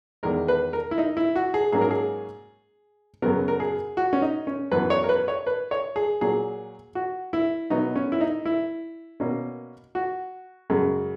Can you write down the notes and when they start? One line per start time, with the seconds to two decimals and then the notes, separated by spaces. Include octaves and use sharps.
0.23 E2 D#3 G#3 A#4
0.48 B4
0.73 A#4
0.91 E4
0.98 D#4
1.17 E4
1.36 F#4
1.54 G#4
1.72 G#2 F#3 A#3 C#4 G#4
1.81 A#4
1.91 G#4
3.22 F#2 C#3 F#3 B3 A#4
3.48 A#4
3.60 G#4
3.97 F#4
4.13 C#4
4.22 D#4
4.47 C#4
4.71 F#2 E3 B3 B4
4.90 C#5
5.04 A#4
5.09 B4
5.28 C#5
5.47 B4
5.71 C#5
5.96 G#4
6.21 A#2 F#3 A#3 G#4
6.95 F#4
7.33 E4
7.70 B2 F#3 B3 D#4
7.96 C#4
8.12 E4
8.21 D#4
8.46 E4
9.20 B2 A#3 C#4
9.95 F#4
10.70 F#2 C#3 G#3